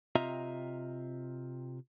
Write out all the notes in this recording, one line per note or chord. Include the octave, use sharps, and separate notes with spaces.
C3 C4 F4 D#5 E5 A#5